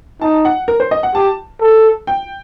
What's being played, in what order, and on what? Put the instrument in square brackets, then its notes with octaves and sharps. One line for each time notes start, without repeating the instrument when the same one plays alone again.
[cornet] D#4 [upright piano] A5
[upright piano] F#5
A#4
C5
D#5
F#5
[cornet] G4 [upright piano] A5
[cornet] A4
[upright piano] G5